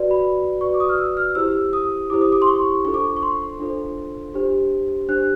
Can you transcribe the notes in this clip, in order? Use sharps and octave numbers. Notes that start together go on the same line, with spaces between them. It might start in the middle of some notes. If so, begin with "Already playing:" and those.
Already playing: F#4 B4 D5
B5
F#4 B4 D5 C#6
D6
D#6
F6
E6
F6
E4 G4 C5 E6
D#6
E4 G4 C5 D6
D#6
D6
C6
C#6
D4 F4 A4 C5 C#6
D6
C#6
C#6
C6
D4 F4 A4 C5
D4 G4 C5
D4 G4 C5 F#6